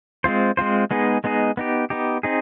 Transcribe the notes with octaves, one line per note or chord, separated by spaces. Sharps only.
G#3 C4 F4 C5
G#3 C4 F4 C5
G#3 B3 D#4 G#4
G#3 B3 D#4 G#4
B3 D#4 G4
B3 D#4 G4
C4 D#4 G#4